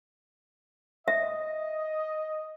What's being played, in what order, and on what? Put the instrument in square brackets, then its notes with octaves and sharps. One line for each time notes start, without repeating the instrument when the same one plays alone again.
[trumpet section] D#5 [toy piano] E5